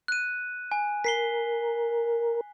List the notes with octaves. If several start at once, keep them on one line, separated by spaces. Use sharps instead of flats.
F#6 D#7
G#5
A#4 B6 C7 G7